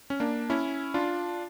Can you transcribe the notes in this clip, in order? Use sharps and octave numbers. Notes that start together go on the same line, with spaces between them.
C#4
A#3 D4
C#4 E4
D4 F4